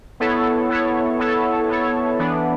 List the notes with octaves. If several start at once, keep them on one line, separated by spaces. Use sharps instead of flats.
B3 E4 A4 C#5
B3 E4 A4 C#5
B3 E4 A4 C#5
B3 E4 A4 C#5
E3 B3 D4